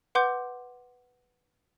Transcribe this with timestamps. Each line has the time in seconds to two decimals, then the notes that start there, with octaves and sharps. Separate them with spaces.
0.15 B4 F#5 C6 D6 G6